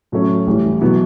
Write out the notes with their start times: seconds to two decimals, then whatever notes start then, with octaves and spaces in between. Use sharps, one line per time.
0.12 A2 F#3 A3 C#4
0.46 A1 A2 E3 G3
0.81 B2 F#3 B3 E4